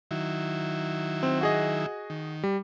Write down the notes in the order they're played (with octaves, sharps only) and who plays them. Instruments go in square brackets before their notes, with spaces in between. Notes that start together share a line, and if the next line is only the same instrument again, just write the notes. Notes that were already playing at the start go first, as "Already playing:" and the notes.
[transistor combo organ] D#3 F#3 E4
[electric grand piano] C4
F#4 G#4 D#5
[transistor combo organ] D#3
[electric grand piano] G3